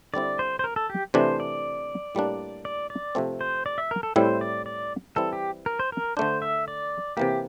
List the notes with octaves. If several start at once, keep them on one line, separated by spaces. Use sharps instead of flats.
D3 G3 C4 E4 D5
C5
C5
A#4
A4
G4
C3 E3 A3 D4 C5
D5
A2 G3 A#3 D4
D5
D5
C3 F3 A3 C4
C5
D5
E5
A#4
A4
A2 G3 C4 E4 C5
D5
D5
E3 G3 C4 E4 A4
G4
A#4
C5
A#4
D3 A3 D4 C5
E5
D5
C3 E3 A#3 G4